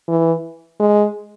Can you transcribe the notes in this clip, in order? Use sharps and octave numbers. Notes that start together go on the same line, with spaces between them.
E3
G#3